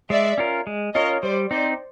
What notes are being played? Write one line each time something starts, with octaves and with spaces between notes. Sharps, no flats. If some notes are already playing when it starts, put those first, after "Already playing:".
G#3 D5 E5
C#4 F4 A#4
G#3
C#4 F4 A#4 C#5 D#5
G3 C5 D5
C4 D#4 C5 D5